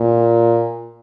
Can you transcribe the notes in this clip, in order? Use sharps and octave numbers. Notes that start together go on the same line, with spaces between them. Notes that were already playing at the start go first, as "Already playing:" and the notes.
Already playing: A#2